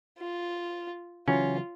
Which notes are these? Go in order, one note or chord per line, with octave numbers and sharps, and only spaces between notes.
F4
C#3 E3 F#3 C#4 F4